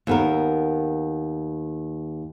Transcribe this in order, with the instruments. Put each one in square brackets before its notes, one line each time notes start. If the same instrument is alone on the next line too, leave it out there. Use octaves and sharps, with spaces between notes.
[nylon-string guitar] D#2 B3 A#4